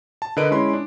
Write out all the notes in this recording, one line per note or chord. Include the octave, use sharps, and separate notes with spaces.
A5
D3 A#4 B4 D#5 D7
G#3 C#4 E4 B5 C6
D4